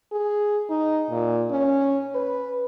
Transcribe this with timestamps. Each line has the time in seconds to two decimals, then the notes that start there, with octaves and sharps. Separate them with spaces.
0.12 G#4
0.70 D#4
1.11 A#2
1.51 C#4
2.15 B4